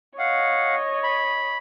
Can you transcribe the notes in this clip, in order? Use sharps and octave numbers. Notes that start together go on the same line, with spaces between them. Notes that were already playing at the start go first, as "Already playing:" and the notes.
C#5 D#5 F5 F#5
B5